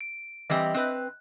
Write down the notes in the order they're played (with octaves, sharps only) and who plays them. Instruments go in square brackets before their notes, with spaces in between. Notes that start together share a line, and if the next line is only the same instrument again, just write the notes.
[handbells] D7
[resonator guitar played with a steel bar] E3 G3 C4 [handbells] D#5 E5 G5
[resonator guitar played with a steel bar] C4 B4 [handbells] F#6